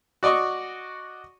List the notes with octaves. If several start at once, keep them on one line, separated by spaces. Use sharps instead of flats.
F#4 D5 D#5 C#6